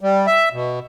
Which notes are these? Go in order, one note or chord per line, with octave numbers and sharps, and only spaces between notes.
G3
E5
B2